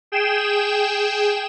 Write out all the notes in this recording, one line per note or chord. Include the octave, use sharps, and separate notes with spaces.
G#4 G5 E7